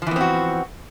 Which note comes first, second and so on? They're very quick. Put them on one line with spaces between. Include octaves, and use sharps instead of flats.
F3 E3 B3 C4 F#4